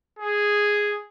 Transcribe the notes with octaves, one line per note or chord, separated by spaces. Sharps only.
G#4